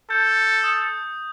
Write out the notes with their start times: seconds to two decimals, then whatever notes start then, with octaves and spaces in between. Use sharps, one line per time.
0.10 A4 G6
0.64 D#6